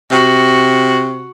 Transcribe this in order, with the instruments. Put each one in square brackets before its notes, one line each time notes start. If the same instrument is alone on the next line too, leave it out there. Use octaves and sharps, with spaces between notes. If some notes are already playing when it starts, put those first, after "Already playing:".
[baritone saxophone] C3 [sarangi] F#4